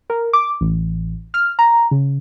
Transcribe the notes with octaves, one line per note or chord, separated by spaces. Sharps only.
A#4
D6
A1
F6
A#5
C#3